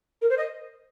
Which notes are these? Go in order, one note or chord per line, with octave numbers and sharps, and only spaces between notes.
A#4
C5
D#5